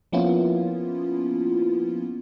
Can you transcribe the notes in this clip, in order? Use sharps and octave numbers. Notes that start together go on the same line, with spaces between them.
F3 A#3 B3 C#4 E4 F4